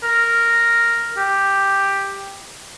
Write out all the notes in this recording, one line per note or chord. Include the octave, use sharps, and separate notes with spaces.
A#4
G4